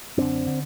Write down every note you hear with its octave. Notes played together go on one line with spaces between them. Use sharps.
F#2 D3 C4 D4
D3